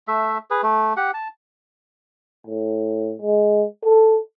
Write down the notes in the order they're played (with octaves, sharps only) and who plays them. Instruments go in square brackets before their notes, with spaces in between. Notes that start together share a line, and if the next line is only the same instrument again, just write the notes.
[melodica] A3 E5
G#4 B4
A3
G4 F#5
A5
[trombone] A2
G#3
A4